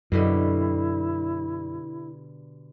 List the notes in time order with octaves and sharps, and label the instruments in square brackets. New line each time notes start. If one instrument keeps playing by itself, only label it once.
[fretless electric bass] F#2 [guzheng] B2 D3 G3 [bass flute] E4